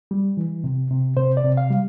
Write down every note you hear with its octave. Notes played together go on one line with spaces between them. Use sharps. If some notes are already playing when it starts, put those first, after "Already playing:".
G3
E3
C3
C3
C3 C5
D5
C3
F5
G3